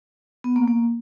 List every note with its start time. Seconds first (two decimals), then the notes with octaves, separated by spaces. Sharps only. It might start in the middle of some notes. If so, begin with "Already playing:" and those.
0.44 B3
0.56 A#3
0.68 A#3